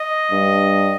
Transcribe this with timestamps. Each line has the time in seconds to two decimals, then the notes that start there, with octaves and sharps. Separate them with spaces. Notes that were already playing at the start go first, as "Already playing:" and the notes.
Already playing: D#5
0.31 G2